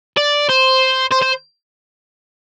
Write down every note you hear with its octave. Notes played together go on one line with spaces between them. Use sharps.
D5
C5
C5
C5